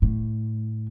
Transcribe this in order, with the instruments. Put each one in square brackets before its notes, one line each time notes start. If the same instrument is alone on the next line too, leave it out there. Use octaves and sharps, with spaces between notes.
[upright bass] A2